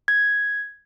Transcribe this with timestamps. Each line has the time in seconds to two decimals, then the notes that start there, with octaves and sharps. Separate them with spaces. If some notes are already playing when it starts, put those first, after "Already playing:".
0.08 G#6